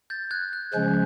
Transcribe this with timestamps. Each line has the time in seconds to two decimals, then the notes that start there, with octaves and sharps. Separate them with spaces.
0.10 G6 A6
0.31 F#6 G#6
0.53 F#6
0.73 C#3 F3 G#3 C#4 G6